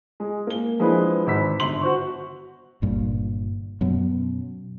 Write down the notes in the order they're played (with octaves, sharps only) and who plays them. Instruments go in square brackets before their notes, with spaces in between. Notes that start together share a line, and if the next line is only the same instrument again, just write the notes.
[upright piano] G#3
A#3 G7
F3 G#3 D4 E4 B4
G#1 B5 E6 B6
G1 C6 F#7
F#4 C5 C#6
[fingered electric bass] G1 G2 A#2
F#2 B2